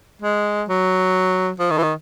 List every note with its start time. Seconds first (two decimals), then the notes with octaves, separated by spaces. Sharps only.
0.22 G#3
0.69 F#3
1.59 F3
1.71 D#3
1.78 E3
1.83 D#3